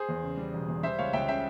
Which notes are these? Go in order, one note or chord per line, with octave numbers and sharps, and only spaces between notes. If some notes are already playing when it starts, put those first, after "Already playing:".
Already playing: G#4 C5
E2
C#3
G3
E1
E2
G3 C5 E5
C#2 C#5 F5
C#2 E5 G5
C#3 E5 G5